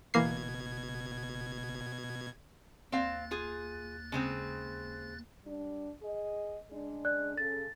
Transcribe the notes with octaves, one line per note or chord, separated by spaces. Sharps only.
F#1 B2 E3 A#3 G#6 C7
D#2 C4 F5 F#6 A6
F4 G#4
C#3 G#3 C4
G3 D4
G#4 D#5
C#3 G#3 D4
D5 F#6
C#3 A4 A6